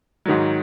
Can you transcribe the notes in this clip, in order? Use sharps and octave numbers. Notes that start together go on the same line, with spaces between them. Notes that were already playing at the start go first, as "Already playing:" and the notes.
G#2 D#3 F#3